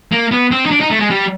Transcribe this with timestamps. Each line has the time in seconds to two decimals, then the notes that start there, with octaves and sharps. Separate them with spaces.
0.12 A#3
0.32 B3
0.52 C4
0.66 D#4
0.71 D4
0.81 D#4
0.91 A3
1.00 G#3
1.11 G3